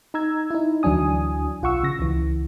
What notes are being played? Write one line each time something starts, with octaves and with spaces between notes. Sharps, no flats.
D#4 A#5 E6 G#6
D#4 E4
D2 E3 F#3 D4 G#5 D#6
B1 F4 F#5 C#6 E6
C#3 A#6
C#2 E3